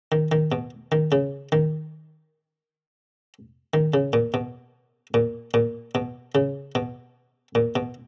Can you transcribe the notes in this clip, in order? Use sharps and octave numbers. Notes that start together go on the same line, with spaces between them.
D#3
D#3
B2
D#3
C#3
D#3
D#3
C#3
A#2
B2
A#2
A#2
B2
C#3
B2
A#2
B2